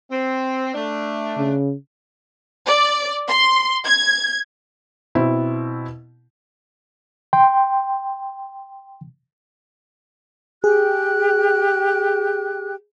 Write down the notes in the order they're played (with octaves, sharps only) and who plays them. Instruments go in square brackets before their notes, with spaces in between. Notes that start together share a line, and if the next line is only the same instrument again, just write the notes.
[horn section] C4
A3 D4
[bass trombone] C#3
[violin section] D5
C6
G#6
[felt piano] B2 C4 E4
[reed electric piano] G5 C6
[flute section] G4 G5 F#6 [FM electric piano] G#4